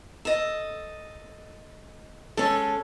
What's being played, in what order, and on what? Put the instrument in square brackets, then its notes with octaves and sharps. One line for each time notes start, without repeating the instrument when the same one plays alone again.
[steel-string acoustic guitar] A4 D#5
[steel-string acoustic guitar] G#3 C#4 [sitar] A4